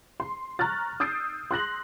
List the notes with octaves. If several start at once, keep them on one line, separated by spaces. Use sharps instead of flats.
C6
A#5 C#6 F6 F#6 A6
D#6 E6 G6 A6 C7 D7
C6 F#6 A#6 F#7